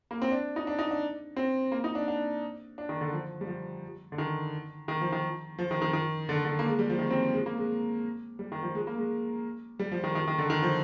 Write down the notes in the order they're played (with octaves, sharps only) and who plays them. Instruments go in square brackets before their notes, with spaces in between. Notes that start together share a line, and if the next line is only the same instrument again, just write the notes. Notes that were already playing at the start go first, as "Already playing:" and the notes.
[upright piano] A#3
C4
D4
D#4
D4
D#4
D4
C4
A#3
D#4
D4
D4
D4
D#3
D3
F3
G3
F3
D3
D#3
D#3
F3
D#3
F3
D#3
D#3
D#3
D3
D3
A#3
G#3
G3
F3
D#3
C4
G#3
A#3
G#3
G3
D#3
F3
G#3
A#3
G#3
G3
F3
D#3
D#3
D#3
D3
D#3
F3